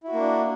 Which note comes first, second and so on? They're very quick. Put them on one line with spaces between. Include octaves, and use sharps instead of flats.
E4 F#4 A#3 D4